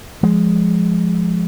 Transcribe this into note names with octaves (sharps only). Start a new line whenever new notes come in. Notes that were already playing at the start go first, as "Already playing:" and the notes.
F3 G#3